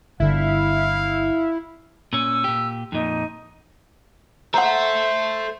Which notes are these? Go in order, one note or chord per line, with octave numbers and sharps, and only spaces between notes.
G1 D3 E4 F5
A#2 C#4 E6
A#2 G4
F2 A#2 D#4
A4 C5 E5 F#5 A#5